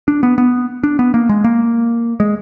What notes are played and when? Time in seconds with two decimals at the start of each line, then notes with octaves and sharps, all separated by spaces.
0.08 D4
0.23 B3
0.38 B3
0.83 D4
0.99 B3
1.14 A#3
1.29 G#3
1.44 A#3
2.20 G#3